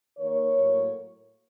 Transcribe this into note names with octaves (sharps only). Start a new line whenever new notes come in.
D#3 A#3 A#4 C#5
A2 F#3 A#3